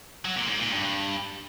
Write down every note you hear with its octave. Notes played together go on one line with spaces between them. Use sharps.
F#3
A#2
G#2
A#2
G2